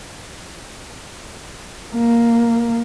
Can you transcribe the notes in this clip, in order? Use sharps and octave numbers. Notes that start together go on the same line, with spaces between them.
A#3